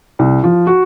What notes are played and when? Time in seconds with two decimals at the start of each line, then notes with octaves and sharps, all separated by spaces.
0.19 C2
0.44 F3
0.67 F#4